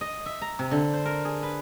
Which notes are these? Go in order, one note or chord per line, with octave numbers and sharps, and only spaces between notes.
D#5
E5
A#5
C3
D3
C5
A#4
G#4
B4